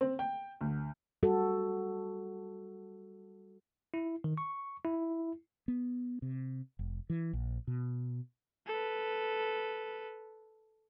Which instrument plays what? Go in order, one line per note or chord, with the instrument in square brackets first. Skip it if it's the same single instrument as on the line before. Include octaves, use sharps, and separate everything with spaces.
[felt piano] C4
G5
D2
[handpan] G3 F#4 A4
[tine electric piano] E4
D#3
C#6
E4
[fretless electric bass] B3
C3
F1
E3
A#1
B2
[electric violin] A4 B4